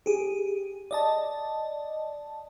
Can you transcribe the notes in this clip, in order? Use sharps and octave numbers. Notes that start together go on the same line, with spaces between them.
G4 G#4
D5 D#5 A5